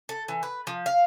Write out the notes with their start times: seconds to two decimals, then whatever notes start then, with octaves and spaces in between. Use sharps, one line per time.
0.09 A4
0.28 E3
0.43 B4
0.67 F3
0.86 F5